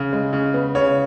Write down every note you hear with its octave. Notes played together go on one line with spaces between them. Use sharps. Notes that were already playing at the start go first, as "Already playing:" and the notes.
Already playing: C#3
G#3
C#3
B3
C#3 C#5